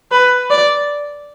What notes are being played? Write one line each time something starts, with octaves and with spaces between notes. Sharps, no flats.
B4
D5